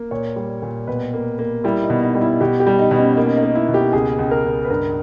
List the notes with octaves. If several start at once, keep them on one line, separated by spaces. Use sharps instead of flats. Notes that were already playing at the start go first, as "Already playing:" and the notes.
Already playing: A#3
A#2 C#5
G3
A#2
B2 B4
A#3
A#3
G3 E4
D#4
B2
D#4
G3
E4
B2 G4
G4
G3
D#4
B2
C#4
A#3 D#4
C#4
D#4
A#3
E4
B2
G4
C#2 G#4
C#2
A#4
C#2
B4
G2 A#4